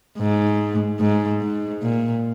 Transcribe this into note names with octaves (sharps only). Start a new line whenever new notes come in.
G#2
G#2
G#2
A#2